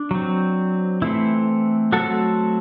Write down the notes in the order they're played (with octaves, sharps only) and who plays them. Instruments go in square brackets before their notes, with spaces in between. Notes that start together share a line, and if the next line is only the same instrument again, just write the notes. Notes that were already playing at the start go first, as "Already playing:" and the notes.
Already playing: [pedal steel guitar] D4
F#3 C4
E3 A3 C4 E4
F#3 A3 C4 F#4 A4